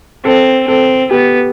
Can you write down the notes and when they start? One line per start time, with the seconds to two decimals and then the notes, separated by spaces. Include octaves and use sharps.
0.24 C4 A4
0.68 C4 A4
1.11 B3 G4